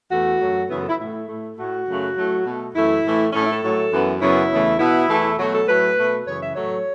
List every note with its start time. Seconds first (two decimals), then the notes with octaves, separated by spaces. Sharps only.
0.11 E2 E3 A3 F#4
0.40 F#2 F#3 A3
0.69 F#2 C#3 E3 B3 E4
0.80 A4
0.89 E4
0.99 A2 A3 E4
1.28 A2 A3
1.57 A2 A3 F#4
1.87 F#2 C#3 F#3 A3
2.17 A2 F#3 A3
2.45 B2 A3
2.75 F#2 E3 A3 E4
3.04 A2 E3 A3
3.33 A2 A3 C#4
3.44 E4
3.52 A4
3.63 A2 F#3 A3
3.92 F#2 E3 B3
4.21 F#2 C#3 F#3 B3 E4
4.50 E2 C#3 E3 A3
4.80 B2 B3 E4
5.09 E2 E3 A3
5.38 B2 F#3 A3 F#4
5.53 A4
5.67 A2 F#3 A3 B4
5.97 B2 A3
6.26 F#2 C#3 E3 C#5
6.40 E5
6.55 A2 F#3 A3 C#5